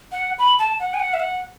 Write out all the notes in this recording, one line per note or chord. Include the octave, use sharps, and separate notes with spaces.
F#5
B5
A5
F#5
G#5
F#5
E5
F#5